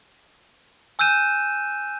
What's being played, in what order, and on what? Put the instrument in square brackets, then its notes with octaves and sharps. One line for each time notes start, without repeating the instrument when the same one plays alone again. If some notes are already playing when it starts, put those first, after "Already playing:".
[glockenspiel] G#5 E6 F#6 G6 D#7 E7